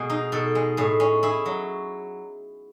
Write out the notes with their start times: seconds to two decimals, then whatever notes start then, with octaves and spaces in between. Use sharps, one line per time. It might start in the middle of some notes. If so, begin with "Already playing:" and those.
Already playing: B2 G#3 G#4
0.10 D#4
0.32 B2 A4
0.55 G#3
0.77 A2 G#4
1.00 C#4
1.23 E4 G#4
1.46 F#3